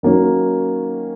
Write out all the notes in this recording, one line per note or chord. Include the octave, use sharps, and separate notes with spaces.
D#3 F#3 A#3 C#4